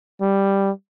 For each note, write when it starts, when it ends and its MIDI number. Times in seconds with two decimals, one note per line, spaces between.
0.21 0.71 55